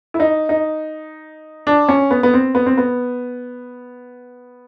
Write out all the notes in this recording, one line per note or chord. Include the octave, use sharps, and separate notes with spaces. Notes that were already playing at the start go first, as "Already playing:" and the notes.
E4
D#4
D#4
D4
C#4
B3
B3
C4
B3
C4
B3